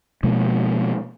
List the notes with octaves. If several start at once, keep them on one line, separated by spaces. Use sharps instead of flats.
B2 F3 G#3 A#3